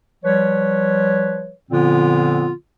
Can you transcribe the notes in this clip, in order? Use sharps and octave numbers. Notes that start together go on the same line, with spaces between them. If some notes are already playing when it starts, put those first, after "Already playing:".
F3 G3 B4 C#5
A#2 D3 F3 B3 C4 F4